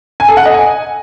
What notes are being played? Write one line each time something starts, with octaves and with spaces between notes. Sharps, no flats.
G#5
A4
F#5
D#5
G#5